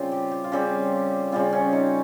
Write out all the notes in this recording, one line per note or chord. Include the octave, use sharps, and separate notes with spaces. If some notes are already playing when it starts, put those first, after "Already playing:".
Already playing: C#3 G3 C4 F4
G4
G4
F4
C#3 G3 C4 G4
C#3 G3 C4 F4
C#4
D#4